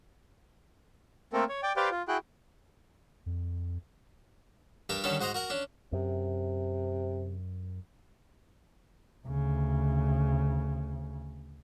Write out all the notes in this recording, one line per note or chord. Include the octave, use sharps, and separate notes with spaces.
A3 A#3 C4 A4 A#4
C#5
D5 G5
G4 B4 C5 D5 F5 G5
F4
E4 F#4 G#4 G5 F#6
F2
G2 G4 A#4 A5
D3 D#3 G3 C#4 A4
G#2 F#4 C5 D#5 A#5
F#4 A#4 F#5
C#4 D4
F#2 C3
D2 C#3